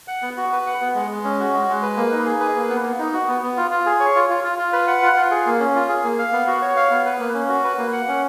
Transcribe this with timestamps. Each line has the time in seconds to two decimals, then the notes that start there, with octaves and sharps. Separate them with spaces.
0.08 F#5
0.22 B3
0.37 F#4
0.52 B4
0.66 F#5
0.81 B3
0.95 G#3
1.10 G#3
1.24 C#4
1.40 F#4
1.54 G#3
1.68 G#3
1.82 B4
1.97 A#3
2.12 D#4
2.26 G#4
2.40 B4
2.56 A#3
2.69 B3
2.84 B3
2.99 D#4
3.13 F#4
3.28 B3
3.42 B3
3.57 F4
3.71 F4
3.86 G#4
4.00 C#5
4.15 F4
4.30 F4
4.44 F4
4.58 F4
4.73 B4
4.87 F#5
5.02 F4
5.16 F4
5.31 G#4
5.46 A#3
5.60 C#4
5.75 F4
5.89 G#4
6.04 A#3
6.19 F5
6.33 B3
6.47 F#4
6.62 C#5
6.76 F5
6.91 B3
7.06 B4
7.19 A#3
7.34 C#4
7.49 F#4
7.64 B4
7.78 A#3
7.92 F#5
8.08 C#4